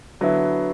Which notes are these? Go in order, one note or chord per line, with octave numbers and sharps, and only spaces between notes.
D3 F#3 B3 E4